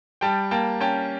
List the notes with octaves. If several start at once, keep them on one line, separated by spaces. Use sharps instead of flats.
G3 G5 A5
A#3 G5 A5
C#4 G5 A5